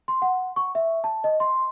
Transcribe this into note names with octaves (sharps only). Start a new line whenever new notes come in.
C6
F#5
C#6
E5
A5
D#5
C6